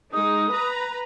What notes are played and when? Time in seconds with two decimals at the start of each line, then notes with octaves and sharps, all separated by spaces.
0.13 G#3 D#4 D#6
0.51 B4 A#5